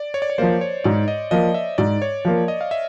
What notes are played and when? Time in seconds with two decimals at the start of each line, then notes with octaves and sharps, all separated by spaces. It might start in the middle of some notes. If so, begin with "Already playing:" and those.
Already playing: D5
0.14 C#5
0.22 D5
0.30 C#5
0.38 F3 A#3 C5
0.61 C#5
0.84 G#2 D5
1.08 D#5
1.31 F3 A#3 D#5
1.54 E5
1.78 G#2 D5
2.02 C#5
2.25 F3 A#3
2.48 D#5
2.61 F5
2.71 E5